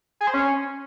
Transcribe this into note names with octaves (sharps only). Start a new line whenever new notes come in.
G#4
C5
C#4